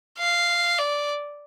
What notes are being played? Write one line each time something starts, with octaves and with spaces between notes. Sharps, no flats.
F5
D5